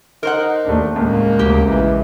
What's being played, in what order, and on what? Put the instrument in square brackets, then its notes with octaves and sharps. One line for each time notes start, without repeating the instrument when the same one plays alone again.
[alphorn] D#4 [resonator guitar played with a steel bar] A#4 C5 F#5
[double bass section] D#2 G#2 [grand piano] A3 D4
[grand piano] C#2 [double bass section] A2 [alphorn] A#3
[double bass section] D2 C#3 [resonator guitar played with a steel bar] G4
[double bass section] A#1 [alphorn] E3